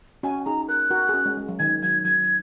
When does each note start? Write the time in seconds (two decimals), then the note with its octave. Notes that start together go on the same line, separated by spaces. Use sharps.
0.23 C#4 F#4 G#5
0.46 D#4 G#4 A#5
0.69 A#4 F#6
0.91 F#4 A#4
1.09 G#4
1.14 C#4 F#4
1.25 G#3 C#4
1.37 G#3
1.48 F#3
1.59 D#3 G#6
1.82 F#3 G#6
2.05 F#3 G#6